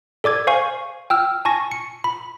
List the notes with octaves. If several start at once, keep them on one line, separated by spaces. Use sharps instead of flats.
A4 D5 D6 G#6
C5 F5 G#5 C#6
G5 E6 F6
G#5 A5 C#6 A#6
C#7
B5